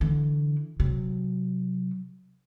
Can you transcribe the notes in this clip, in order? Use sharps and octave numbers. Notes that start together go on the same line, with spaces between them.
D3 E3
C3 F#3